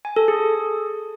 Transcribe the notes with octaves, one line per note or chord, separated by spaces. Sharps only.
G#5
A4
G#4